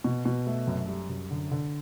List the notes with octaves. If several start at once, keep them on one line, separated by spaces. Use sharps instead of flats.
B2
B2
A3
F#2
G3
F#2
D3
D3